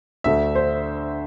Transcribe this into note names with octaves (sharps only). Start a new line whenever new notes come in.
D2 D3 A3 E5
C5